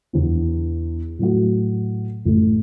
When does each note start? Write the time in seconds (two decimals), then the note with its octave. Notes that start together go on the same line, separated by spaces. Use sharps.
0.13 E2 D3 B3
1.19 A2 F#3 A3 F#4
2.25 A1 A2 A3